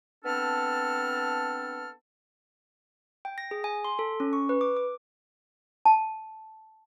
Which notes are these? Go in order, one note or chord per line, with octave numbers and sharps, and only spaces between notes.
B3 C4 D4 A4 A5 F6
G5
A#6
G#4
G#5
C6
A4
C#4
C#6
B4
D6
D6
A5